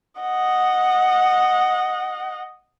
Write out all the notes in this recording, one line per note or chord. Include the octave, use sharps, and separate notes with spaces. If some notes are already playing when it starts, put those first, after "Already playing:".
D#5 F#5